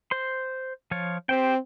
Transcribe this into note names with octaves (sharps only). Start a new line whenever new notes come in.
C5 C6
F3 F4 C#5
C4 G4 C5 G5